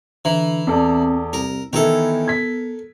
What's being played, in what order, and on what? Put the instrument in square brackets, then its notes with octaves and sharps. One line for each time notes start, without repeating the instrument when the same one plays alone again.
[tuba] D3 [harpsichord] E3 [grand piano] A#5
[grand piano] E2 A4 D5 [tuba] C4
[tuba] C2 [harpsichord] A#4
[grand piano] D#3 E3 E4 [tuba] B3 [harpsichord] A4 A#4
[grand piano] G#6 B6